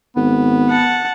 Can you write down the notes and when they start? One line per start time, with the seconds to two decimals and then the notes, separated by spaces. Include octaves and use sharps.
0.16 G#1 B3
0.70 F#5 A5